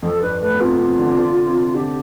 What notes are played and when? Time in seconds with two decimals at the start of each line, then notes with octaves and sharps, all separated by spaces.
0.02 F2 F3 A4
0.22 G2 G3 B4
0.41 A2 A3 B4
0.54 B3
0.60 C3 C4 F4
0.79 C3 C4
0.98 D3 D4
1.09 C4
1.17 D3 D4
1.46 C3 C4
1.74 D3 D4 G4